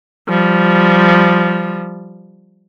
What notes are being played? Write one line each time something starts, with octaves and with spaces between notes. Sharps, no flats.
F3 G3